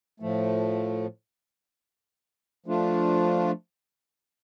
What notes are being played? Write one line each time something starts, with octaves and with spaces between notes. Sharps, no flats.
A2 F3 A3
F3 A3 D4 F4